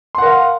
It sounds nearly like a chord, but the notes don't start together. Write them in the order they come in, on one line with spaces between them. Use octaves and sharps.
C6 F#5 A#4 F5